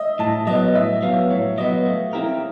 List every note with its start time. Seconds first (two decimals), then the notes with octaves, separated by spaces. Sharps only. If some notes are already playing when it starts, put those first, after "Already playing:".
Already playing: D#5 E5
0.19 A2 A5
0.47 F#3 B3 D#5
0.68 D#5
0.74 A2 E5
1.02 F#3 B3 F5
1.30 A2 C#5
1.58 F#3 B3 D#5
1.86 A3
2.13 C4 E4 G4 A#4